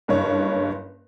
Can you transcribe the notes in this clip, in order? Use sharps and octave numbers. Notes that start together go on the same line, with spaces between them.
F#1 G2 C#5